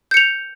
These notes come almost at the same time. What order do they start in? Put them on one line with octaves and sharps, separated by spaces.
G6 C#7 F7